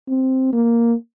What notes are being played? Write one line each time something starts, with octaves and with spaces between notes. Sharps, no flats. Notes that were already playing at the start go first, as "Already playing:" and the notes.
C4
A#3